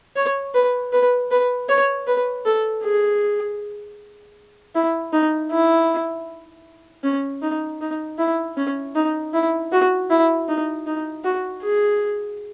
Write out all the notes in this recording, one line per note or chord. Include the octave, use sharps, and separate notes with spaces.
C#5
B4
B4
B4
C#5
B4
A4
G#4
E4
D#4
E4
C#4
D#4
D#4
E4
C#4
D#4
E4
F#4
E4
D#4
D#4
F#4
G#4